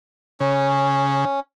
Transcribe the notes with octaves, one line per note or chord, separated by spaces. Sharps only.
C#3 C#4